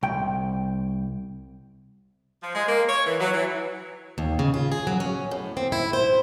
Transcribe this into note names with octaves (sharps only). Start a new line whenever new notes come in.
C2 G5
F3
G#3
A#3
C#5
E3
F#3
E3
D#2
C#3
F4
G#4
F#3
C#4
A2
C4
E4
C5